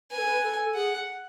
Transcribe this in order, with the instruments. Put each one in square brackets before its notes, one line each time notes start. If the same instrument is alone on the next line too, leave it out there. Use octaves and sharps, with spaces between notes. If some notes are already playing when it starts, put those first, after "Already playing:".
[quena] B4 [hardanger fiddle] G#5
[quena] A4
B4
A4
[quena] G#4 [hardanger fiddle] F#5